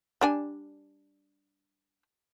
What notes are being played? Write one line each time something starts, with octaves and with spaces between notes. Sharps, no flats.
G3 D4 G#5